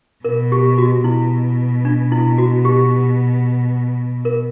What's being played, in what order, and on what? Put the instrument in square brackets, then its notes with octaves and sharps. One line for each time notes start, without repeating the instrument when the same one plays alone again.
[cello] B2 [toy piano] A#4
[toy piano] G4
F#4
[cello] B2 [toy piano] E4
[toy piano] D4
E4
F#4
G4
A#4